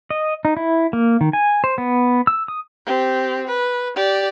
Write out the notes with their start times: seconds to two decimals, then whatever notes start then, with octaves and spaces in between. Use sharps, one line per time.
0.10 D#5
0.45 D#4
0.57 E4
0.93 A#3
1.21 D#3
1.33 G#5
1.64 C5
1.78 B3
2.27 E6
2.48 D#6
2.86 C4 G4
3.47 B4
3.96 G4 D5